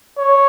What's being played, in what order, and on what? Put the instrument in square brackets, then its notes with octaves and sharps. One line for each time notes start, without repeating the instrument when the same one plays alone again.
[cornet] C#5